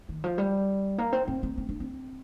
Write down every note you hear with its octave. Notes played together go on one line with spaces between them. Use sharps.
D#3
F3
G3
A#3
C4
C4
C4
C4
D4
C4